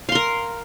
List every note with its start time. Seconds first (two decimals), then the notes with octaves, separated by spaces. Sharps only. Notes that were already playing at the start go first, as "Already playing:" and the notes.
0.09 F5
0.12 C6
0.15 A#4